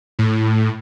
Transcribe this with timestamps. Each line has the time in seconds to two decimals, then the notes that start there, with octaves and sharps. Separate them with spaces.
0.19 A2